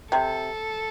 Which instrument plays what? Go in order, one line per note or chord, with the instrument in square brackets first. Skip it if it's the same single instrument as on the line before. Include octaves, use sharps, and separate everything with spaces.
[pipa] C3 [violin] A4